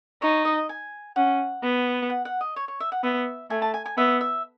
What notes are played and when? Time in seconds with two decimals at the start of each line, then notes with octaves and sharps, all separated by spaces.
0.22 D#4 C#5
0.45 D#5
0.69 G#5
1.16 C#4 F#5
1.63 B3
2.10 F#5
2.25 F#5
2.41 D#5
2.56 C#5
2.68 C#5
2.80 E5
2.92 F#5
3.03 B3 E5
3.50 A3 G#5
3.62 A5
3.74 G#5
3.86 G#5
3.98 B3 E5
4.21 E5